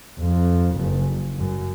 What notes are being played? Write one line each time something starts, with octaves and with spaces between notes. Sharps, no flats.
F2
F#1
F#2